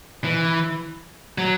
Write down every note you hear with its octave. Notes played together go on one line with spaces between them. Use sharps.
E3
F#3